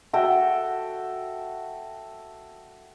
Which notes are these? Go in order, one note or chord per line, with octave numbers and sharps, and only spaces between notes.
F#4 A4 E5 G5